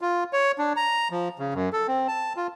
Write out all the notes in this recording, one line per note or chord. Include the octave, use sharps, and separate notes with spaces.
F4
C#5
D4
A#5
F3
C#3
F#2
A4
C4
A5
F4